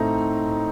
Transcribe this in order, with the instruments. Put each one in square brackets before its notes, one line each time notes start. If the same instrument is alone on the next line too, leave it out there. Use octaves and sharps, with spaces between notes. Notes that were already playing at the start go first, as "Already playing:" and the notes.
Already playing: [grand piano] A2 A3 C4 D#4 A#5